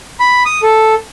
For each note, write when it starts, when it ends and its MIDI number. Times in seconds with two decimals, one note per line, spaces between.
0.20 0.43 83
0.45 0.61 87
0.63 0.95 69